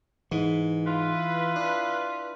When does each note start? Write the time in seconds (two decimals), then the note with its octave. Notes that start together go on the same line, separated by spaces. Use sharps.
0.32 G#2 E3
0.87 E4 F4 B4
1.56 D4